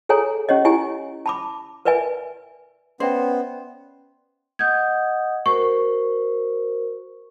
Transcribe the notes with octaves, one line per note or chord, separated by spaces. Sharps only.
G#4 A4 C#5 G#5 A#5
C#4 G4 C#5 D#5
E4 G4 G#5
A5 B5 D6
A#4 B4 D5 E5 G#5
B3 C#4 C5 D5 E5 G5
D#5 F#5 D#6 G6 G#6
F#4 A#4 C5 C#6